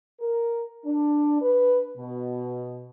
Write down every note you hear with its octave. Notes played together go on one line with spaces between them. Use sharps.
A#4
D4
B4
B2